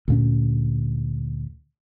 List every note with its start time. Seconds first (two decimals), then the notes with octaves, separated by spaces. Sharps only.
0.08 D2 A#2 C#4